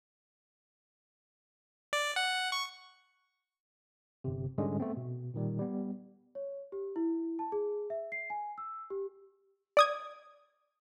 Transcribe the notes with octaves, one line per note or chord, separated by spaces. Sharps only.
D5
F#5
C#6
G1 C3
G#2 D3 G3 G#3 C#4
A3 B3 C4
B2
A#2 D#3 G3
G3 B3
C#5
G4
E4
A5
G#4
E5
C7
G#5
E6
G4
D5 D#6 G#6